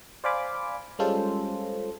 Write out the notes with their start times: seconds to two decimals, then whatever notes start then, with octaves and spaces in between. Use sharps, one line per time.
0.24 C5 D5 F5 G#5 B5 D6
0.99 G3 G#3 C#4 F4 A4 C5